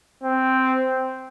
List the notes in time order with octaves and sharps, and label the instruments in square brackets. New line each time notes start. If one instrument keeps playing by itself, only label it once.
[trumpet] C4